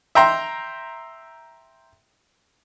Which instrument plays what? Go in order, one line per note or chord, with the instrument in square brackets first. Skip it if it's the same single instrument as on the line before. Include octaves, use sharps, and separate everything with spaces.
[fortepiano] E5 G5 A#5 C6